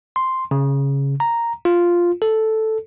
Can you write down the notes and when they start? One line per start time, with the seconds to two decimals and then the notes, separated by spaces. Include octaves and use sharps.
0.16 C6
0.51 C#3
1.20 A#5
1.65 F4
2.22 A4